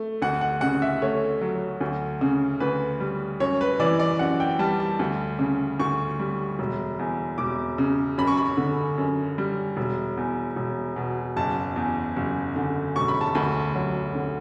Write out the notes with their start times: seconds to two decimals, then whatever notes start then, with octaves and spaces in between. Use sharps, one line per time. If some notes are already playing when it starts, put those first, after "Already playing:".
Already playing: A3
0.22 D2 F#5
0.41 F#5
0.61 C#3 F#5
0.82 E5
1.02 A3 C#5
1.41 F#3
1.81 D2
2.21 C#3
2.60 D2 B4
3.00 G3
3.40 F#2 C#5
3.61 B4
3.80 E3 D5
3.99 D5
4.19 F#2 F#5
4.40 G5
4.59 G3 A5
4.80 A5
4.99 D2
5.39 C#3
5.79 D2 C#6
6.19 G3
6.59 E1
6.99 E2
7.38 E1 D6
7.78 C#3
8.18 F#2 B5
8.27 C#6
8.37 B5
8.57 D3
8.98 F#2
9.38 G3
9.77 E1
10.17 E2
10.56 E1
10.96 B2
11.36 F#1 A5
11.76 E2
12.16 F#1
12.56 D3
12.96 E1 C#6
13.08 B5
13.21 A5
13.35 D2 B5
13.76 F#3
14.15 D3